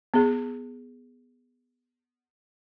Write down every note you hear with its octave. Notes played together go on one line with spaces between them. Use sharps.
B3 G#4